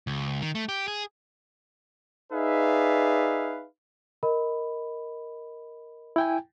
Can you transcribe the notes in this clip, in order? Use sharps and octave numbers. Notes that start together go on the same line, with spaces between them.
C#2
D#3
A3
G4
G#4
D#4 G#4 B4 D5 E5 F5
A#4 D#5 B5
E4 G5 G#5